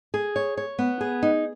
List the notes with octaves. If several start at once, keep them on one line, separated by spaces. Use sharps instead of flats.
G#4
C#5
C#5
B3
G#4
D#4